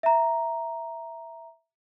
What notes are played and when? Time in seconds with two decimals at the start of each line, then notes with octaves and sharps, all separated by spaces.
0.03 E5 A#5